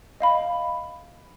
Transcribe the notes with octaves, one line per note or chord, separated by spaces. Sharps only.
D#5 F5 B5